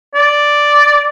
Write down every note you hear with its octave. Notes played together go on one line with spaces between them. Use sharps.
D5